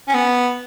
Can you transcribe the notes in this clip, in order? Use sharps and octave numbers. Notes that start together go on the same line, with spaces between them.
C#4
B3